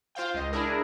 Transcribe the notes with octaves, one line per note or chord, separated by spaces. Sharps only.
F4 C5 F5 G5
C#2 D#5
D4 E4 G#4 A#4